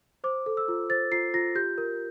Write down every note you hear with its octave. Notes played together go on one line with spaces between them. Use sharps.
C5 D6
A4
E6
F4
C5 A6
F4 C7
F4 A#6
G4 G6
A#4